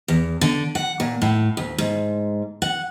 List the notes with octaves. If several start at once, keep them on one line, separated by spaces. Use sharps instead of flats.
E2
D3
F#5
A#2
A2
D2
G#2
F#5